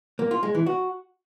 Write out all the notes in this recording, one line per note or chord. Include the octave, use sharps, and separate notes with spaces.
A#3
F4
G#3
E3
F#4